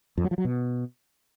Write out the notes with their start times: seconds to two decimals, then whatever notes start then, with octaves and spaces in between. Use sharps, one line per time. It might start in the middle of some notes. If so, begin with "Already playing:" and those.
0.17 F2
0.24 F#3
0.31 F3
0.38 F#3
0.45 B2